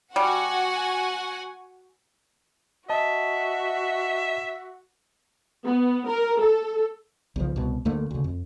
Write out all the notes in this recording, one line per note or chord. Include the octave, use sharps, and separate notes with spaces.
G3 F#4 F#5 G#5
F#4 D#5 E5 A5
B3
A#4
A4
B1 C#3 F3
C2 B2
D2 D3 A3 A#3
D2 C#3
F2